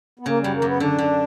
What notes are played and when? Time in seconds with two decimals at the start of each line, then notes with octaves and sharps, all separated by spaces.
0.19 B3
0.26 C#3 A#3
0.40 F#2 G3
0.54 A#3
0.62 F#2 B3
0.80 D3 D4
0.98 D3